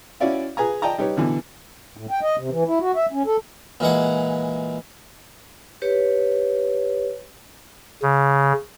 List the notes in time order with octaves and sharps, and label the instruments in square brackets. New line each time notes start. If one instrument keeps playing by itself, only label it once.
[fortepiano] C#4 E4 F#4 D5 E5 F5
G#4 B4 G#5 A#5
D5 D#5 G5 A5 A#5
G3 D#4 G4 B4 C#5
B2 D3 E3
[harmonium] A2
G5
D#5
C3
E3
E4
F#4
E5
C#4
A4
[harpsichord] A#2 E3 G#3 F#5
[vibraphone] G4 B4 C#5
[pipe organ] C#3